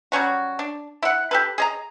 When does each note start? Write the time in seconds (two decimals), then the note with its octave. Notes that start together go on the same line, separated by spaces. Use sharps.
0.12 F#3 G3 C#4 F#4
0.59 D4
1.02 E4 F#5
1.31 G4 A4 B4
1.58 G#4 D#5 A#5